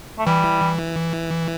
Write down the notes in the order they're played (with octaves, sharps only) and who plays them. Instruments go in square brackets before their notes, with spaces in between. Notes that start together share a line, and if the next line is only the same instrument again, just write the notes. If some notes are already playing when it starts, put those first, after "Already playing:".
[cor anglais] A3
[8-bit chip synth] E3 [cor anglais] G3